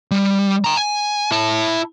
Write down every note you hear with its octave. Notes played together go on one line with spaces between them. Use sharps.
G3
G5 A#5
G#5
E4 A5